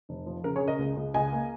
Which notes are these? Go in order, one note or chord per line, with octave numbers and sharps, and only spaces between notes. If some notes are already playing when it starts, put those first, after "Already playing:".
F1
F3
C#3 A#4
G#4 C#5
C#3
A#4 D#5
C#2
C#2
C#2 D#5 G#5
A#3